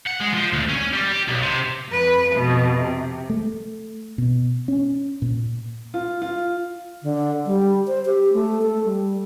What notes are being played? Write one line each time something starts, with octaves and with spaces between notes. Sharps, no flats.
F#5
G#3
F3
D2
C#4
G3
G4
B1
C3
F2 B4
F2 B2
C3
A3
B2
C#4
A#2
F4
F4
D3
G3
C5
G4
A3
A4
G3